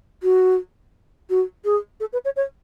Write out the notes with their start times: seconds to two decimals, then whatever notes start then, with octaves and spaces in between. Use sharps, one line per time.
0.23 F#4
1.29 F#4
1.64 G#4
2.00 A4
2.12 B4
2.24 C#5
2.36 C#5